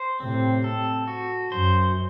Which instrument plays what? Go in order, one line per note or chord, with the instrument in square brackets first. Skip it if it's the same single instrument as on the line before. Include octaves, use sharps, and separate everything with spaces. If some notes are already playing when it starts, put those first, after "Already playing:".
Already playing: [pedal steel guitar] C5
[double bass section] A2 C3 [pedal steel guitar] C4
[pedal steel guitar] A4
F#4
[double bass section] F#2 [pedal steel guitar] C5